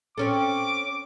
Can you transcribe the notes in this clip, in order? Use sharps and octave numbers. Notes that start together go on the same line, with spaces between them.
C4 C#4 A4 D6